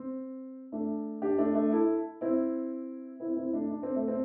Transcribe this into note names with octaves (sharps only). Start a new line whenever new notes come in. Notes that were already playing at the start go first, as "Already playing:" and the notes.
Already playing: C4
A3 D4
D4 G4
A3 D4
A3 D4
E4 A4
C4 E4
C4 E4
C4 E4
A3 D4
D4
C4
A3
C4